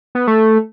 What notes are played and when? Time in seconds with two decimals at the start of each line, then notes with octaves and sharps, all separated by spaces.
0.15 B3
0.27 A3